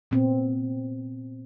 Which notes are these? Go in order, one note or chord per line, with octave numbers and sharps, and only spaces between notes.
A#2 B3 C4